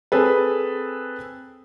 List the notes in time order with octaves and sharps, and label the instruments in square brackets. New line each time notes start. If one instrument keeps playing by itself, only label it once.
[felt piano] C4 G#4 A4 B4